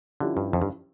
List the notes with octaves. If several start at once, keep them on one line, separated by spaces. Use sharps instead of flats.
D3 F3 C#4 E4 G4
G2
F2
G2